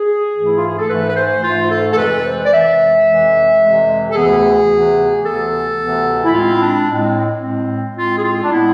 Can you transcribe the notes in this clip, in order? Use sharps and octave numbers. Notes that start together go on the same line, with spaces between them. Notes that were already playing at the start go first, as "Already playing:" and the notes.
Already playing: G#4
G#2 E3 A3
E4
F4
G#4
A4
G#2 E3 A3 B4
B4
C5
G#2 E3 A3 F4
A4
A4
F2 C3 E3 G#3 B4
C5
D5
F2 C3 E3 G#3 E5
F2 C3 E3 G#3
F2 C3 E3 G#3
A4
D2 C3 E3 B3 G#4
D2 C3 E3 B3
D2 C3 E3 B3 A4
D2 C3 E3 B3
E4
A2 G#3 C4 F4
E4
D4
A2 G#3 C4
A2 G#3 C4
A2 G#3 C4 F4
G#4
F4
D4
A2 G#3 B3 E4